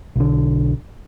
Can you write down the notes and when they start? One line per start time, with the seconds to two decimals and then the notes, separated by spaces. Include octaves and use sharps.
0.16 B1 D3